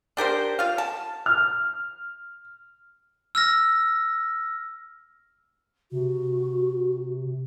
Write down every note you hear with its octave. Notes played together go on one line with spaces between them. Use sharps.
D4 G4 A#4 C5
F4 F5
A5
F6
E6 F6 A#6
C3 F#4